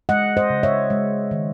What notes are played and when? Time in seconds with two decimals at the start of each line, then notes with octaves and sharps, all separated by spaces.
0.09 G#3 D#5 F#5
0.37 C5 D#5
0.50 C#3
0.63 C#5 E5
0.90 G#3
1.31 D#3